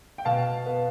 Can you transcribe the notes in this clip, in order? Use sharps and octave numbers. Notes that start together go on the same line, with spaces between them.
G5
B2 F5 A5
B3